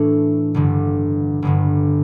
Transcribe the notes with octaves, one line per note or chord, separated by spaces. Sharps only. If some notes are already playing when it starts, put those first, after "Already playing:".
Already playing: A2 E3 A3 D4 A4
G1 G2 D3
G1 G2 D3